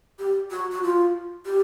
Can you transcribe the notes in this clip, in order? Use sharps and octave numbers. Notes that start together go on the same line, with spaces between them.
G4
F#4
F#4
F4
G4